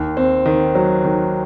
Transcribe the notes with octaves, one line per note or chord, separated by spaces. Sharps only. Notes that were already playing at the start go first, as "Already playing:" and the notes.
Already playing: D#2
C4
D#3
F#3
D#3